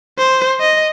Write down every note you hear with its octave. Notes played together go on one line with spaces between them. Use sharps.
C5
D#5